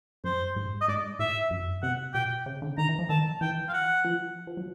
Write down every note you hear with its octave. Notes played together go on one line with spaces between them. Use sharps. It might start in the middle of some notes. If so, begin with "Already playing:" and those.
F#2 C5
G#2
D#5
G#2 D5
A2 E5
F#2
C3 F#5
B2 G5
C#3
D3
D#3 A#5
E3
F3
D#3 A5
E3 G5
F5
F#5
F3
F3
F#3